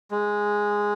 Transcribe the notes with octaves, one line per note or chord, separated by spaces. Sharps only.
G#3